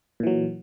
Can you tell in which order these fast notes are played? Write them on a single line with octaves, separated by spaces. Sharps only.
A#2 E3 F#3